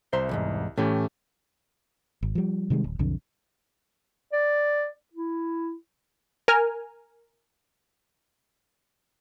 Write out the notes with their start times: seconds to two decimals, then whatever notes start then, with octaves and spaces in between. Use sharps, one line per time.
0.13 C2 C5 E5 A#5
0.29 B1 E2 G#2
0.77 A2 E3 A3 C#4 G4
2.23 G#1
2.35 F3 G3
2.70 C3 D#3 G3 G#3
2.84 D1
2.99 B1 F2 D3
4.33 D5
5.13 E4
6.48 A#4 G#5 F6